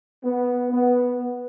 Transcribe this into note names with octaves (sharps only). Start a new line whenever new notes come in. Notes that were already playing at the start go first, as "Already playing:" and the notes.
B3
B3